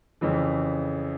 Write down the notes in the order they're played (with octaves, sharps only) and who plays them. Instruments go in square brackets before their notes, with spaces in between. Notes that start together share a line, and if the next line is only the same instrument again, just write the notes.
[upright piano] F2 C#3 E3